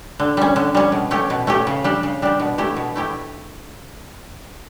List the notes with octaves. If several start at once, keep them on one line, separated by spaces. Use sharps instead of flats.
D3
G3 C#4
D3
G3 C#4
B2
A3 C#4 G4
B2
A3 C#4 G4
C#3
G3 D4 G4
C#3
G3 D4 G4
B2
A3 E4 G4
B2
A3 E4 G4